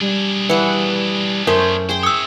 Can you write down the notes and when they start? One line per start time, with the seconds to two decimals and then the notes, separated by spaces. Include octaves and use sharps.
0.01 G3 D4 G#4
0.50 E3 B4 F#5
1.47 F#2 A3 C#4 A#4 C5
1.89 G#4 C5 G5
2.03 C#5 E5 D#6 E6